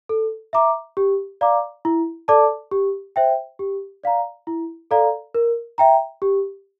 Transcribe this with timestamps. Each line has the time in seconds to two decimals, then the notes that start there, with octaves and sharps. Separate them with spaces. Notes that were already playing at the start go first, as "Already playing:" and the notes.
0.09 A4
0.53 E5 A#5 D6
0.97 G4
1.41 D5 F5 A#5 D6
1.85 E4
2.28 A4 D5 A5 D6
2.71 G4
3.16 C5 E5 G5
3.59 G4
4.03 D5 F5 A#5
4.47 E4
4.91 A4 D5 F5 A#5
5.34 A#4
5.78 E5 G5 A#5
6.22 G4